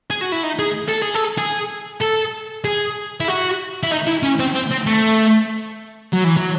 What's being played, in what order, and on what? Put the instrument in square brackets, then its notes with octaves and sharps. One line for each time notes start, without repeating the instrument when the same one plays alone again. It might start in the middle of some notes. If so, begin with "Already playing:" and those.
[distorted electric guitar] G#4
F#4
E4
D#4
G#4
A4
G#4
A4
G#4
A4
G#4
E4
F#4
E4
D#4
E4
C#4
C4
C4
C4
A3
F#3
E3
F#3